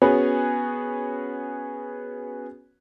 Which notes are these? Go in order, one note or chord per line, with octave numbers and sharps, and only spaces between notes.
B3 C#4 F#4 G#4 B4 C#5